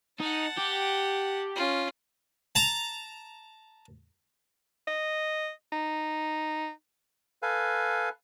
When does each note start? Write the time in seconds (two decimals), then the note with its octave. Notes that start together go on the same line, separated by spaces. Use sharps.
0.20 D#4 F#5 A5
0.57 G4
1.56 C#4 F4
2.55 A5 A#5
4.88 D#5
5.72 D#4
7.42 A4 B4 F5 G#5